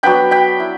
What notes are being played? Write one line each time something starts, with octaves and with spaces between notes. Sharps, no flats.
F#3 B3 D4 G5 B5
G5 B5
E4